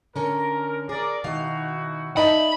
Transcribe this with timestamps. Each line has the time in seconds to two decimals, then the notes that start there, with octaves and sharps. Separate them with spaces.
0.16 D3 C#4 A#4
0.89 G#4 A#4 D5
1.24 B2 D#3 D#4 E4 F#4 F5
2.17 D#4 D5 E5 A5 B5